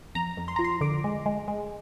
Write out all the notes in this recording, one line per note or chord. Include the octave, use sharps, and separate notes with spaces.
F2 A#5
F2
C6
F3 A#5
C6
D3 D6
G#3
G#3
G#3